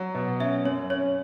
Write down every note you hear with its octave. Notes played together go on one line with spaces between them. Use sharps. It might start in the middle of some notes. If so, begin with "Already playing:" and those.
Already playing: F#3 F#5
B2
C#4 E5
F#2 C#5
C#4 C#5